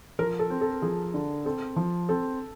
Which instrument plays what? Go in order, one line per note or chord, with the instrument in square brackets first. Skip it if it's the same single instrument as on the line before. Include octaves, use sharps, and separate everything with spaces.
[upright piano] F3 [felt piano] A#4
[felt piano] A4
[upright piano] C4
[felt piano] A4
[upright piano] F3 [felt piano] G#4
[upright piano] D3
[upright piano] C4 [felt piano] A4
[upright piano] F3
[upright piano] C4 [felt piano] A4